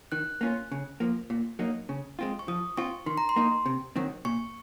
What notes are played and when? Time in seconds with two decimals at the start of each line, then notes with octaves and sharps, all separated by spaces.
0.12 D#3 F#6
0.41 A#3 C#4 F4
0.72 C#3
1.00 F3 A#3
1.30 A#2
1.59 F#3 A#3 D#4
1.89 C#3
2.19 G#3 C4 F4
2.39 C#6
2.48 F3 D#6
2.77 C4 F4 C#6
3.06 D#3 C6
3.17 A#5
3.29 C6
3.36 A#3 D#4
3.66 C3
3.96 D#3 F#3 C4
4.25 A#2 C#6